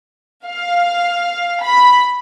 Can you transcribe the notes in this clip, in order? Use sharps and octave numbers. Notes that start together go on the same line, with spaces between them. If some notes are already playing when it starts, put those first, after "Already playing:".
F5
B5